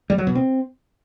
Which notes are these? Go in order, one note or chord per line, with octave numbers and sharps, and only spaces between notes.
G3
F#3
B2
C4